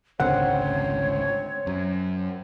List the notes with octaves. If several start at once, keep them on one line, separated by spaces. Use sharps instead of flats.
G#1 C#2 D3 C4 C5 C#5 F#5
F#2